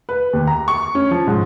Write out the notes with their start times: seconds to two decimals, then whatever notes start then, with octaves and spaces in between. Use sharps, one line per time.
0.09 B4
0.33 D#2
0.47 A#5
0.68 C#6
0.95 C#4
1.11 F3
1.27 G#2